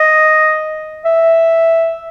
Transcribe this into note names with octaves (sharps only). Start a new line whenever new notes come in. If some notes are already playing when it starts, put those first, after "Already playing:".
Already playing: D#5
E5